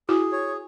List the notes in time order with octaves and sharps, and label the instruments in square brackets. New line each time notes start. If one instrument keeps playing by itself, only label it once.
[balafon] E4 F#4 [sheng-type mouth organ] G#4
[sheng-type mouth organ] C#5